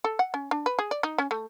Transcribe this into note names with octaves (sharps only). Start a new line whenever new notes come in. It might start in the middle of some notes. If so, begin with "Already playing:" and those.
A4
F#5
C#4
D4
B4
G#4
D5
D#4
C#4
A3